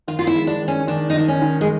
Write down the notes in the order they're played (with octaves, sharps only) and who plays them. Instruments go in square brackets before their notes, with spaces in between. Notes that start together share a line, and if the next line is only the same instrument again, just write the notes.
[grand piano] D#3 [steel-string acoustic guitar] F4
[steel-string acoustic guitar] F4
E4
[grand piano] G#3
[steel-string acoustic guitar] D4
[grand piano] D#3
[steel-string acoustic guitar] C#4
[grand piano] D#3 [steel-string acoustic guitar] D4
[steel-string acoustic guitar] D#4
[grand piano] D#3 [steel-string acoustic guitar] D4
[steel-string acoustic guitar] C#4
[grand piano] D#3
[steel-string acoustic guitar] G#3